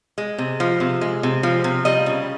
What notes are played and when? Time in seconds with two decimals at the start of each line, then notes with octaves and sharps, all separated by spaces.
0.18 G#3
0.38 C3
0.60 F3
0.80 C3
1.01 G#3
1.23 C3
1.43 F3
1.64 C3
1.85 G3 D#5
2.06 C#3